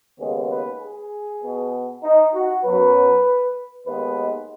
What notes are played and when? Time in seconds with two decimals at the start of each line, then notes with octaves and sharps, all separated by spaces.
0.20 D#2 C#3 G#3 B3 G#4
0.50 B4
0.82 G#4
1.43 B2 B3
2.04 D#4
2.34 F#4
2.65 F#2 F#3 B3 B4
3.87 D#2 D#3 G#3 B3 B4